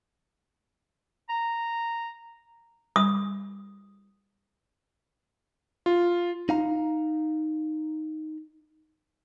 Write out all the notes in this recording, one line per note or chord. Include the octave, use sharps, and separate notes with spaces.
A#5
D#6
F4
D#4 F5 A#5